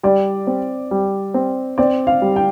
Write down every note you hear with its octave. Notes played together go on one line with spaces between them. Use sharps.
G3 D5
C4
G3
C4
C4 D5
F5
G3
G5